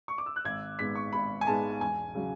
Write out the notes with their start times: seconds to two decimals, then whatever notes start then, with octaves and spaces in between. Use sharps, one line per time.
0.08 C#6
0.18 D6
0.26 E6
0.36 F#6
0.45 G#1 G#6
0.79 G#2 G#3 B3 B6
0.95 C#6
1.13 G#1 B5
1.41 G#5
1.47 G#2 G#3 B3 A5
1.80 E1 G#5
2.15 C#3 F#3